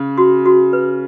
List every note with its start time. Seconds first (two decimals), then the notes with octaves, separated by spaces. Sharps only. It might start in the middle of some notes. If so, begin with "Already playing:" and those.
Already playing: C#3
0.18 F#4
0.46 F#4
0.73 B4